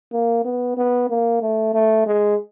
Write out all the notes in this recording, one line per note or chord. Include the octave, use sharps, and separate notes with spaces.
A#3
B3
B3
A#3
A3
A3
G#3